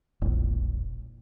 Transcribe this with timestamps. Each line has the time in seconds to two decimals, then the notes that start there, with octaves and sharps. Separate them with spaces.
0.22 E1 A#1